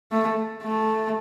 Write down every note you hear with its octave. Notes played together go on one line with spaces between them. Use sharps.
A3
A3